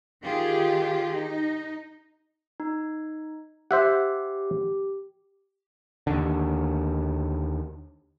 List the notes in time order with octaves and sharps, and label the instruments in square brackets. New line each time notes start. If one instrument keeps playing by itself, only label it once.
[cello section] D#3 F4 G4 G#4
D#4
[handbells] D#4
[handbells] G4 [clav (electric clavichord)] C5 E5 F#5
[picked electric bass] D#2 D3